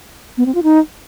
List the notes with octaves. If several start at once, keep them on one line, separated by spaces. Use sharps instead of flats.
B3
C4
F4
D#4